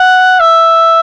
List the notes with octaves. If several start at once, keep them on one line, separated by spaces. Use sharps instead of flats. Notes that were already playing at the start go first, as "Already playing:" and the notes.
Already playing: F#5
E5